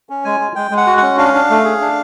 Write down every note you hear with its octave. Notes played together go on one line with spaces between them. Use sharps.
C#4
G#3 G#5
G#3
G#3 G5
G#3
F#5
F#4
C#4 F#5
D4 F5
D4
A3
G#4
D4